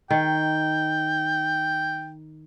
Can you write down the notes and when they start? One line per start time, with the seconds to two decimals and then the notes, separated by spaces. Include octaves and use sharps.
0.11 D#3 G5